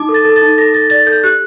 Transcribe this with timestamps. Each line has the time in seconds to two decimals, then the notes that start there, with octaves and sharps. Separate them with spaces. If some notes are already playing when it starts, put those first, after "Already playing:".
Already playing: D#4 D6
0.09 A4
0.14 A6
0.25 A4
0.36 A6
0.42 D#4
0.58 A4 A#6
0.73 A4 A6
0.90 D5 A6
1.06 A4 G6
1.23 G4 F#6